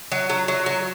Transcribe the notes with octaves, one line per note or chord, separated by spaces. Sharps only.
F#3
F#3
F#3
F#3